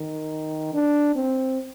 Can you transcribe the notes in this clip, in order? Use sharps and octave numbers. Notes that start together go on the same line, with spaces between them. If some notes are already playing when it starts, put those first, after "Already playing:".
Already playing: D#3
D4
C4